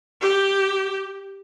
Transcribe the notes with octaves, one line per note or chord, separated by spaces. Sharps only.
G4